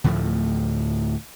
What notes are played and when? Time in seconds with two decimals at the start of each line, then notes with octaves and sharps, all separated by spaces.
0.04 D2 A2 F3 A3